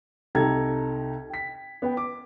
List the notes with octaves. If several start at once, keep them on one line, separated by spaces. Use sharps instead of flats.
C2 D#4 G4 A4 A#5 G#6
G5 B6
B3 B4 G5
D6